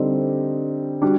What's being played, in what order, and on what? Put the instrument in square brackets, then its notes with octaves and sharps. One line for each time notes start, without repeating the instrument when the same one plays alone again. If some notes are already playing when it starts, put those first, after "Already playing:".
Already playing: [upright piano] D3 G3 C4 D#4
G3 D4 F#4